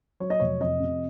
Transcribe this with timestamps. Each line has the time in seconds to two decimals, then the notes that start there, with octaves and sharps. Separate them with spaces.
0.20 F#3 C#5
0.30 D#5
0.40 F1 C#5
0.60 F2 D#5
0.80 C3